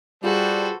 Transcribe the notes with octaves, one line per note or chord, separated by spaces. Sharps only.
G3 F4 F#4 G#4 A4 B4 C5